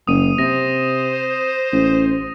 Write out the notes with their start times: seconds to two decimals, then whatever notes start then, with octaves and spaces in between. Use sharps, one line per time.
0.07 F#1 D#6 D#7
0.38 C3 C5 A#6
1.73 A1